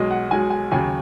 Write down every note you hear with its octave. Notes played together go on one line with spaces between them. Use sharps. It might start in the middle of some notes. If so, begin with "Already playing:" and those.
Already playing: B1 B2 G#3 D#5
F#5
B1 B2 G#3 G#5
G#5
D#2 C#3 F#3 G#5